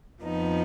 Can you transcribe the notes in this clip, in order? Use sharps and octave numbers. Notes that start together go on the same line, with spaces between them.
F2 F3 B3 D#4